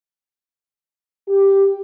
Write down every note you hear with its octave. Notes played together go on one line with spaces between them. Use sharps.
G4